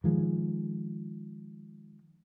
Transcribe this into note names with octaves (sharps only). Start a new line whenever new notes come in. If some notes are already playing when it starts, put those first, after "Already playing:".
D#3 F3 G#3